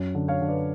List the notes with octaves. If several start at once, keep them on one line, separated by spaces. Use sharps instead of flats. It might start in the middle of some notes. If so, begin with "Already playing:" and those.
Already playing: F#2
D3
C#5 F5
D3
B4 D5